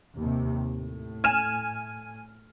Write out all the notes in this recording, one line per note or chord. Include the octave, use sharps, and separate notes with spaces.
D#2 C3
A2
G#5 F6 E7